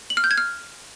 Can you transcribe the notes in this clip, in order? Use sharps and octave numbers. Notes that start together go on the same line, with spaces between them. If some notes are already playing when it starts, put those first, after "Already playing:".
F#7
F6
G6
G#6
F6